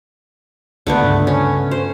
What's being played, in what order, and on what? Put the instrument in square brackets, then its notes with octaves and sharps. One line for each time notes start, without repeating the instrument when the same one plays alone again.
[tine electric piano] C#2 [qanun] D3 A3 B3
[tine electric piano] G2 C#3 D4
[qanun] C#4
C5